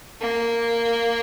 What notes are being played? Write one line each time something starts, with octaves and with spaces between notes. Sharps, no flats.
A#3